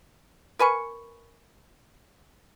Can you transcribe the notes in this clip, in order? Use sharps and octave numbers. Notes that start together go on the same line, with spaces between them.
A#4 B4 G#5 C#6